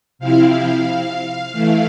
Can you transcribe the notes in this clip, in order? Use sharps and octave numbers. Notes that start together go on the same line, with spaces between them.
C3 F3 C4 E4 F5
E3 A3 E4